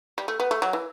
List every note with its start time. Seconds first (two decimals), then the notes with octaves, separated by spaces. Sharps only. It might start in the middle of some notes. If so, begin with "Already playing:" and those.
0.18 G3
0.28 A3
0.40 B3
0.51 A3
0.62 F#3
0.73 E3